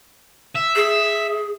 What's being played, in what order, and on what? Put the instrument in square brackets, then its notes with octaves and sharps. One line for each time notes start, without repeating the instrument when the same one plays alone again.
[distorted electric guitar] E5
[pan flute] G#4